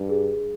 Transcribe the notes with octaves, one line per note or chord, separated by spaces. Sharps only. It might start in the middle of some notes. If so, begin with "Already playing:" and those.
Already playing: G2
G#4